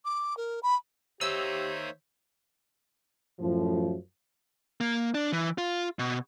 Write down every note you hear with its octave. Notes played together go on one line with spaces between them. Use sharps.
D6
A#4
B5
D#3 A#3 D#4 G4 C5 C#5 E5 E6
F#2 A2 F3
A#3
D4
E3
F4
B2